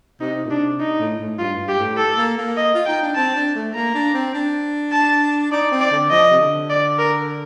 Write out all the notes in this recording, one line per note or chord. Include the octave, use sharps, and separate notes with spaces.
C3 D#4
A#2
C3 D4
D#4
A2
A2
G2 F4
G2
G4
A2
A4
A#3
A#3
D#5
F4
D#4 G5
D4
C4 A5
D4
A3
A#3 A#5
D4
C4
D4
A5
D#4 D5
C4
D5
D3
F3 D#5
C3
D3
D5
A#4